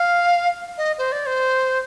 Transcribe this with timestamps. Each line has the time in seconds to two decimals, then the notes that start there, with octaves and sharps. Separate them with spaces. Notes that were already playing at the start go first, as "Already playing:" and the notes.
Already playing: F5
0.78 D#5
0.98 C5
1.12 D5
1.26 C5